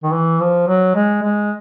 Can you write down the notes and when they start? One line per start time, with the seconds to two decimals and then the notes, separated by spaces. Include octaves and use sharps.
0.04 D#3
0.12 E3
0.40 F3
0.68 F#3
0.95 G#3
1.23 G#3